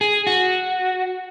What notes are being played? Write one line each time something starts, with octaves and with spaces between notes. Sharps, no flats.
G#4
F#4